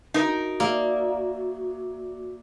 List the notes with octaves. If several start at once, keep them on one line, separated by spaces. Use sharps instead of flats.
D#4 F#4 A#4
A#3 D5 E5 E6